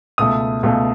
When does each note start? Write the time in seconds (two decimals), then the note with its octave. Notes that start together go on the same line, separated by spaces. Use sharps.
0.18 C#2 B2 A3 D#6
0.63 C#2 B2 A3